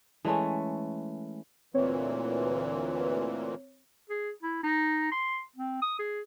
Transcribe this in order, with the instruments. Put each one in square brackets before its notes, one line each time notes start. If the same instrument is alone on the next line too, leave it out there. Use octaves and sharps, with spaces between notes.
[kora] E3 G#3 A3 C#4
[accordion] D2 A#2 E3 [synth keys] C4 C#5
[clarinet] G#4
E4
D#4
C6
C4
D#6
G#4